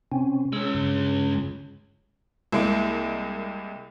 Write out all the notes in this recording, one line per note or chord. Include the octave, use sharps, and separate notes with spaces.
C3 C4 C#4
G#3 C#4 E6
G2 C#3
C2 G#3 A#3